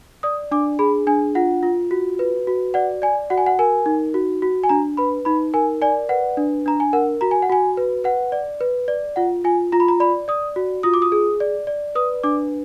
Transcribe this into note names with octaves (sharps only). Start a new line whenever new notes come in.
D5 D#6
D4 D6
G#4 B5
D4 G#5
F4 F#5
F4
F#4
B4
F#4
D5 F#5
D5 G#5
F#4 F#5
G#5
F#5
A#4 G#5
D#4
F#4
F#4
G#5
D4 A#5
B4 B5
D#4 B5
A#4 G#5
D5 G#5
B4 F#5
D4
D4 A#5
G#5
A#4 F#5
F#4 A#5
G#5
F#5
F#4 G#5
B4
B4 F#5
D5
B4
D5
F4 F#5
F4 G#5
F4 A#5
B5
A#5
D5 B5
D5 D#6
F#4
F4 D#6
D6
D#6
G#4
D5
D5
B4 D#6
D4 D6